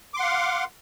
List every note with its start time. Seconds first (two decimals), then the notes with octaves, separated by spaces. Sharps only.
0.14 D6
0.17 C6
0.20 F#5
0.23 F5